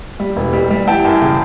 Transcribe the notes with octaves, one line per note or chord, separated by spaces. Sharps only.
G3
E1
G3
G3
E3 G5 A5
F#2
C#3